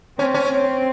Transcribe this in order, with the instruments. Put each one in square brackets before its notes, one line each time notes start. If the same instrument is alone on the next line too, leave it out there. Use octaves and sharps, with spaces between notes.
[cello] C4 [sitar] C#4
[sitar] C#4
[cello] C4